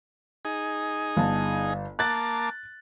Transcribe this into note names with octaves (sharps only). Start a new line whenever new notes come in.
D#4 G#4
G1 A5
A#3 A5 D6 F#6 A6